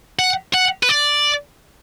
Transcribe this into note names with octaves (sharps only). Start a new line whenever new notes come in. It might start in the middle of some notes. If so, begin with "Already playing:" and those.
F#5
F#5
B4
D5